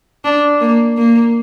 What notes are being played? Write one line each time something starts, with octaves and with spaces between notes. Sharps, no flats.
D4
A#3
A#3